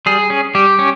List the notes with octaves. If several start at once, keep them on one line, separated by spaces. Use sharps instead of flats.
G3 G#4
C#4
G3 G4
C#4